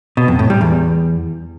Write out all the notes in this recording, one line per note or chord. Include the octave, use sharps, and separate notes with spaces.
B2
F2
A2
G3
E2